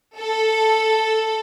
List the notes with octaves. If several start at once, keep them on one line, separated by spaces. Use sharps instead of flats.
A4